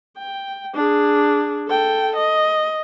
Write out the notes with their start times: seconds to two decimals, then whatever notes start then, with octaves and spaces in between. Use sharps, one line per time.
0.17 G5
0.75 D4 G#4
1.68 A4 G5
2.16 D#5